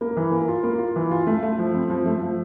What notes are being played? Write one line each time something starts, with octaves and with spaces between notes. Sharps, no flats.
A#3
E3
A#3
F4
A#3
F4
E3
F4
A3
A3
F3
C4
F3
A3
F3